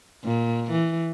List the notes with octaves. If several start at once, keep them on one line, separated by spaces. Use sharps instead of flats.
A#2
E3